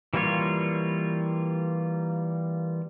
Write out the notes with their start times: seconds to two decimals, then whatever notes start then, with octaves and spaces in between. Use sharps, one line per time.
0.14 E3 G3 A#3 F4 C#5